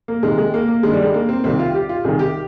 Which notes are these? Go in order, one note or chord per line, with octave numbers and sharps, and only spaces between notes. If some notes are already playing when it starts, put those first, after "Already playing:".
A#3
C2 C3 D#3 G#3
G#3
A#3
A#3
G2 D#3 G#3
G3
G#3
A#3
C4
C2 C3 D#3 C4
F4
G4
F4
C2 C3 D#3 G#4
G4